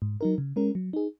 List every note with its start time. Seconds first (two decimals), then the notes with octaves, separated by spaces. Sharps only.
0.02 G#2
0.21 F#3 D#4 A#4
0.38 C#3
0.56 G#3 C#4 A#4
0.75 F#3
0.93 D#4 G#4